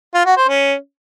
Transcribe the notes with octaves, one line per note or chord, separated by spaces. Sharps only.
F4
F#4
C5
C#4